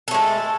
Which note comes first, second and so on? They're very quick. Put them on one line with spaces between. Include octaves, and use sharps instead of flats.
A4 A3 G#3